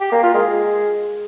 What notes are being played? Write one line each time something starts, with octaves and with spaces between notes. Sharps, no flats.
G4
A#3
F4
G#3